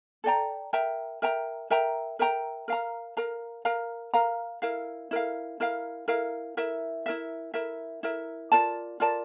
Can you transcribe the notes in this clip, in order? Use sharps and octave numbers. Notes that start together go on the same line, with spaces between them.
A4 D5 G5 A#5
A#4 E5 G5 A#5
A#4 E5 G5 A#5
A#4 E5 G5 A#5
A#4 E5 G5 A#5
A#4 F5 A#5
A#4 F5 A#5
A#4 F5 A#5
A#4 F5 A#5
E4 A#4 F5
E4 A#4 F5
E4 A#4 F5
E4 A#4 F5
E4 A#4 E5
E4 A#4 E5
E4 A#4 E5
E4 A#4 E5
F4 A#4 D5 A5
F4 A#4 D5 A5